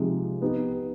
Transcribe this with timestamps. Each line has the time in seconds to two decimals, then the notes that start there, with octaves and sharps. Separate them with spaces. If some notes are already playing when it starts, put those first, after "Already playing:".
Already playing: C3 F3 G#3 C4 D#4
0.42 B3 D#4 G4